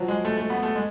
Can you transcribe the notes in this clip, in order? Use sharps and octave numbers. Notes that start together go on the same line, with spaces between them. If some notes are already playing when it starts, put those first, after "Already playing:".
Already playing: F3 F#3
G#3
A3
A3
B3
A3
G#3